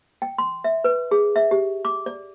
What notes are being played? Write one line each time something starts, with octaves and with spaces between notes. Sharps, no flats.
G5
C6
E5
B4
G#4
E5
G4
D6
D5